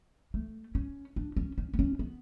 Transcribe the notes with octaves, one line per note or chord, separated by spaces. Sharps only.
A3
C#4
D4
C#4
C#4
B3
C#4
B3